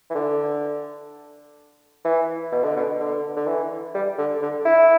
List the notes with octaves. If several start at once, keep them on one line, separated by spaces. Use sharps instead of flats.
E3
D3
E3
B2
D3
B2
D3
D3
E3
G3
D3
D3
E4